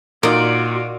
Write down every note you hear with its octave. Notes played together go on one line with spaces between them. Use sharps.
A#2 D#4 F4 F#4 A#4 D5